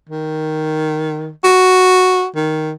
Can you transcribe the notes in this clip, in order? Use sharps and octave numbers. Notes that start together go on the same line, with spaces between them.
D#3
F#4
D#3